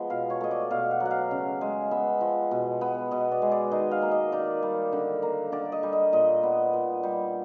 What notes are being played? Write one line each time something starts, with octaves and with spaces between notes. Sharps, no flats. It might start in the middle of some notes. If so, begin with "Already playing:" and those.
Already playing: F3 G#3 B3
B2 F5
C#5
A3 D#5
D5
B2 F5
F#5
F#3
F#5
F5
C#3
G#3
B3 E5
F3
B2
B3
B2 D#5
D5
G#3
D5
D#3 D#5
F5
A#3
D#5
D#3 D5
G3
D3
A#3
D3 D5
D#5
G3
D#5
A#2 D#5
B3
A#2
G3